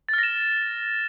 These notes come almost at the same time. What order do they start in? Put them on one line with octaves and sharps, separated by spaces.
A6 F6 A#6 E7